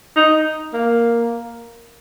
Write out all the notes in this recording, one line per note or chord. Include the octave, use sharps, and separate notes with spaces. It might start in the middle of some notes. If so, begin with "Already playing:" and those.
D#4
A#3